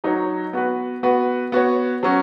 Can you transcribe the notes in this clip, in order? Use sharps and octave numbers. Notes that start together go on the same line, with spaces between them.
F#3 D#4 F#4 C#5
B3 F#4 B4
B3 F#4 B4
B3 F#4 C#5
F#3 C#4 F#4